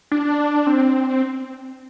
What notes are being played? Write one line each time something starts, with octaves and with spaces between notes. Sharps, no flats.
D4
C4